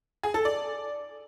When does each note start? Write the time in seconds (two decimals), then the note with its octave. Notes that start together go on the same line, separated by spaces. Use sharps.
0.23 G#4
0.34 A4
0.45 D5